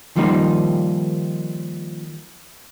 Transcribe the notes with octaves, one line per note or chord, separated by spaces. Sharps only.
D#3 F3 G3 A#3 D#4